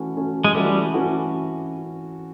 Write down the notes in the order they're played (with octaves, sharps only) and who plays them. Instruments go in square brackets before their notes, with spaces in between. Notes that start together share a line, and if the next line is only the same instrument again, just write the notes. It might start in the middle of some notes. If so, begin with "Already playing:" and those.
Already playing: [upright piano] E3 A3 C#4 F#4
E3 A3 C#4 F#4
[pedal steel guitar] G#3
[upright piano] E3 A3 C#4 F#4 [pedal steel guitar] G3
[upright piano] E3 A3 C#4 F#4